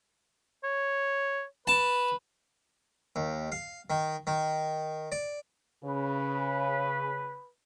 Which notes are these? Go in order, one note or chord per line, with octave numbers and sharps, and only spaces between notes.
C#5
B4 A5
D#2
F5
D#3
D#3
D5
C#3 B4